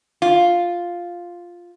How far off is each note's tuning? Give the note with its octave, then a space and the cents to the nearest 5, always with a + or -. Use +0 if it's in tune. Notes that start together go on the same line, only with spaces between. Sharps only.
F4 +0